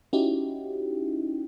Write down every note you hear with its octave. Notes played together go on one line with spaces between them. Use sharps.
C#4 D#4 E4 F#4 G4